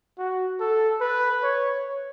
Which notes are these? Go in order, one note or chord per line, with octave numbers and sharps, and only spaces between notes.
F#4
A4
B4
C#5